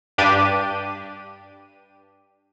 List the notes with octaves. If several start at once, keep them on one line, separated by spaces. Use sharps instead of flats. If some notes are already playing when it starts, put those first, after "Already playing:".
G2 D4 G4 D#7